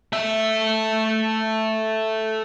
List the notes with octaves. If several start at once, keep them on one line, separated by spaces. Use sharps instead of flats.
A3 E5